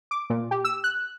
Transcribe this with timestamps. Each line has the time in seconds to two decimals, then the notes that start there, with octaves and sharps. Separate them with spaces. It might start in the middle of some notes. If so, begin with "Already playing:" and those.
0.11 D6
0.30 A#2
0.51 G4
0.65 E6
0.84 F#6